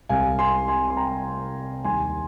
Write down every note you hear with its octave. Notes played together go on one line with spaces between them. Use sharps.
C2 C3 G3 F5 G#5
G#5 C6
G#5 C6
C6
G5 A#5
D#2 D#3 G3 G#5 C6